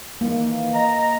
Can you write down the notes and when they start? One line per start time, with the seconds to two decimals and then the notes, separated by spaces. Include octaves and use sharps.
0.21 D#3 E3 A#3
0.74 D#5 A#5